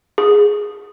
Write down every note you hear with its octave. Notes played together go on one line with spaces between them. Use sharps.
G#4